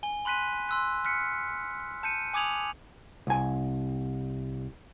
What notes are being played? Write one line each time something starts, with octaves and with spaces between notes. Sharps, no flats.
G#5 G7
B5 C6 F#6 B6 D#7
C6 E6 F#6
F6 F#6 B6 C#7
A5 G6 C#7 D#7
G#5 D6 D#6 G#6 F7 F#7
C2 G#5